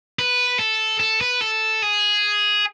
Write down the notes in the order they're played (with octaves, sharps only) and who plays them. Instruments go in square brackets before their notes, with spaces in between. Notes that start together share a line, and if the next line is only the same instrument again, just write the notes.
[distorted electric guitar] B4
A4
A4
B4
A4
G#4